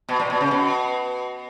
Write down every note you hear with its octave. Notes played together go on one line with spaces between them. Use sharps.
B2
A#2
B2
C#3
B2